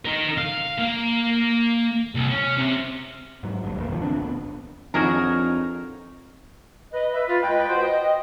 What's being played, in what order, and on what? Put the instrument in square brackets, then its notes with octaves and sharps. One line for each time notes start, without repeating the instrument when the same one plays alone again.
[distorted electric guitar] D#4 A#4
F5
A#3
C2
C#4
C3
[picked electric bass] G#2 F#3
A1 D2 G2
B1 E2 A#2
C#2 G#2 D#3 F3
D2 C4 D4
D#1 A1 A#2 B3
[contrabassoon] F2 [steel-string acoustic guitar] D4 D#4 C#5 [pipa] F#4 G#4 A#4
[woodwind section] B4 D#5
[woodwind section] B4 [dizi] E5
[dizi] F4
[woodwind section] C#2 B4 D#5 [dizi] G5
[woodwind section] F#4 B4 C5
D#5